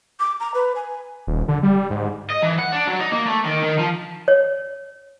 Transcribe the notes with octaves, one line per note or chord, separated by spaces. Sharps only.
D6
A#5
B4
G#5
D#1
D3
G3
G#2
D#5
E3
F#5
D4
F#3
D#4
A#3
A3
D#3
D#3
F3
C#5